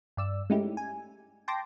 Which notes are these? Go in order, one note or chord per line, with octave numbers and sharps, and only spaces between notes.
G2 D5 E6
G#3 A3 C#4 D#4 E4 G4
G#5
G5 A5 C6 D6 A#6